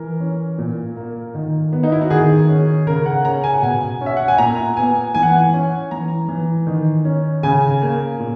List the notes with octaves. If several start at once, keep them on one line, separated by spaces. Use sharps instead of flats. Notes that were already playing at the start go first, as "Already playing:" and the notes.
Already playing: E3 A#4
C#4
A#2
A#3
D#3
B3
D#4
E4
F#4
D#3 G#4
C#4
C#3 A#4
F#5
C#4 A#5
G#5
F#5
B2 G#5
C#4
E5
F#5
G#5
A#2 A#5
B3 G#5
E3 G#5
F#5
G#5
C#4
E3 A#5
E3
D#3
C#4
C#3 G#5
A#3
A#2